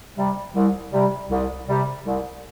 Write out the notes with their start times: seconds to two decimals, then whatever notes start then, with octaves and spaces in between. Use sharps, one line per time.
0.16 C3 G3
0.54 C2
0.91 C3 G3
1.30 C2
1.68 C3 G3
2.05 C2